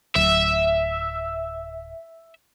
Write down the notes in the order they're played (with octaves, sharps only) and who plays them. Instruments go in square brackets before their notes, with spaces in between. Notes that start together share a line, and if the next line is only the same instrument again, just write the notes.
[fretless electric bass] D1 [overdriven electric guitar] E5